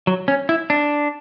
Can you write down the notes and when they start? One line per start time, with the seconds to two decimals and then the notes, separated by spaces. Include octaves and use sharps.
0.07 F#3
0.28 C#4
0.49 E4
0.70 D4